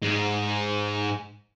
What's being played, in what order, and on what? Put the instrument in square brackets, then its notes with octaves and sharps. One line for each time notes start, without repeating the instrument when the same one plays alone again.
[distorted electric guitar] G#2 G#3